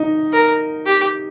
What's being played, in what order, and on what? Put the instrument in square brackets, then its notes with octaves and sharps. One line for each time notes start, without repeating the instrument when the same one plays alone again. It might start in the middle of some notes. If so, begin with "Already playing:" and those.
Already playing: [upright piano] D#4
[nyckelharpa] A#4
G4